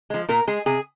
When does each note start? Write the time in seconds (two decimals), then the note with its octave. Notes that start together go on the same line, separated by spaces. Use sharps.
0.10 F3 G#3
0.29 A#2 A#4
0.47 G#3 G#4
0.66 C3 G#4